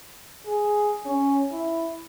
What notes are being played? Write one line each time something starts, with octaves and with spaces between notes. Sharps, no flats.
G#4
C#4
E4